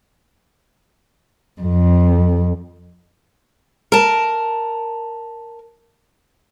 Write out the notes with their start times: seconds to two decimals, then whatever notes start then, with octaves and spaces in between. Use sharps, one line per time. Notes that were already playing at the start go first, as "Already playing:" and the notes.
1.62 F2
3.92 A#4 A5